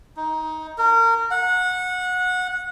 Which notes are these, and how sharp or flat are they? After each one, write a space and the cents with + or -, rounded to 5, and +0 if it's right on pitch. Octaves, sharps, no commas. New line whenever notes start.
D#4 +15
A#4 -25
F#5 -20